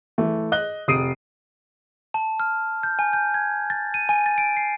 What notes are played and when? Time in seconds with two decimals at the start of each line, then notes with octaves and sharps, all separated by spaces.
0.18 E3 A3
0.52 D#5 F#6 G7
0.88 F1 D#6 C7 D7 D#7
2.14 A5
2.40 F6
2.83 G6
2.99 G#5
3.13 G6
3.34 G#6
3.70 A6
3.94 D#7
4.09 G#5
4.26 A6
4.38 D7
4.57 C7